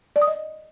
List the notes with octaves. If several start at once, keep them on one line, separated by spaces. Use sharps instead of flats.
D5
D#6
D#5